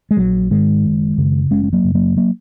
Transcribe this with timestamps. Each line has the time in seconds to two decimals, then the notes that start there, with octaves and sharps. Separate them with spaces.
0.11 G#3
0.17 A#1 F#3
0.51 G#2 D#3 G#3
0.84 F#1
1.18 F#2 C#3
1.50 F#1 G#3 C#4
1.64 G#3
1.73 F#3 A#3
1.84 F#2 C#3
1.95 F#3 A#3
2.17 F#3 A#3